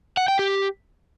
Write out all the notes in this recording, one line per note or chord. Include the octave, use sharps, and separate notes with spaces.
F#5
G5
G4